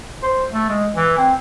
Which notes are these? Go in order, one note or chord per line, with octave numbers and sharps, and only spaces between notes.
C5
A3
G#3
E3
C4